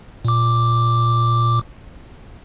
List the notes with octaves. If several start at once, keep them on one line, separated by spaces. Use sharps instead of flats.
A#2 D6